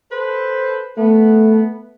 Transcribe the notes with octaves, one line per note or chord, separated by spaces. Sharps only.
A4 B4 C5
A3 B3